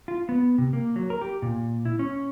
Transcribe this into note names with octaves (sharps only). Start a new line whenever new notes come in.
F4
B3
C3
A#3
F#3
A#4
G4
A#2
E4
C#4